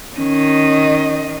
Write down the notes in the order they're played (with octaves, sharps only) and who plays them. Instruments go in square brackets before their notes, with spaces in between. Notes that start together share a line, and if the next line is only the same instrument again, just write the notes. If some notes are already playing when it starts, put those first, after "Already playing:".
[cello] D#3 D#5 [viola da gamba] C#4